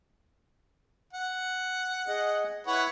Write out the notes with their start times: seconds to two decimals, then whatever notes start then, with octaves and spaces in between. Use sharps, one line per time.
1.13 F#5
2.08 G#4 D#5
2.67 E4 B4 C#5 F#5